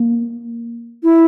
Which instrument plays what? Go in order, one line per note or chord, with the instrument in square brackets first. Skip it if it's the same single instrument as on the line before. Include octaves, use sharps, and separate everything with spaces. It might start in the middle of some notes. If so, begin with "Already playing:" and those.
Already playing: [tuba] A#3
[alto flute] E4